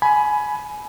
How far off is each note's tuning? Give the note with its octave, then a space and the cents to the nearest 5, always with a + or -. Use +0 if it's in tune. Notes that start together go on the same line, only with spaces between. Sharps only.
G#5 +20 B5 +0